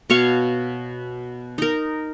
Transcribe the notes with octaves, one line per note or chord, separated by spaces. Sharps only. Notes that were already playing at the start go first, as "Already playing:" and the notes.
B2 C#5 F5 C#6
D#4 A#4